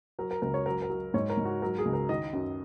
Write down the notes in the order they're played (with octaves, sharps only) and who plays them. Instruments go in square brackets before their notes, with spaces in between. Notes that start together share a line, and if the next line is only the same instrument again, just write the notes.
[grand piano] F#3 A#4
A#4
C#2 A#4
C#5
F#3 A#4
A#4
F#3
G#2 C#5
A#4
G#2
F#4
F#3 A#4
G#4
C#2
A#4
D#3 D#5
F#2